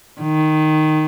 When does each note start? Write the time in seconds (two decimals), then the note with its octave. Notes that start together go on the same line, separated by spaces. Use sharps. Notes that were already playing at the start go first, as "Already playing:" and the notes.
0.21 D#3